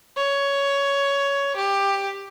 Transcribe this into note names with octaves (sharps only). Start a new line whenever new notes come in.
C#5
G4